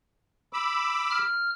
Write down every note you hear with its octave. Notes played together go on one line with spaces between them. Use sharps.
B5 D6 E6
F6